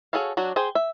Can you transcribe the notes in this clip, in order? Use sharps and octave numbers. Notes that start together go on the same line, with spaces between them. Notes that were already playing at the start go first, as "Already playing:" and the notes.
F#4 G#4 A4 C#5 F5
F#3 D4 F#4
G#4 C5 G5
E5